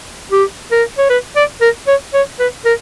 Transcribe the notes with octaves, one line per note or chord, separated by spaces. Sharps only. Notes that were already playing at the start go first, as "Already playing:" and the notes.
G4
A#4
C#5
B4
D5
A#4
C#5
C#5
B4
A#4